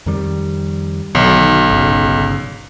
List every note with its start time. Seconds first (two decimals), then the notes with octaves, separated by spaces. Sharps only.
0.06 F2 D#3 G3
1.15 B1 D3 D#3
1.71 G1 C#3